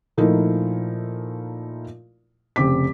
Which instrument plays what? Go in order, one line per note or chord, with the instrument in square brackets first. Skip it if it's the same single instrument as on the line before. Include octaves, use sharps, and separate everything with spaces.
[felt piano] A#2 F3 A3 D#4 E4 A#4
F1 C#3 C4 D6 B6